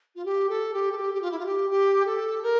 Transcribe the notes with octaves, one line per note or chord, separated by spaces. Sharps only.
F4
G4
A4
G4
A4
G4
G4
F4
E4
F4
G4
G4
A4
A#4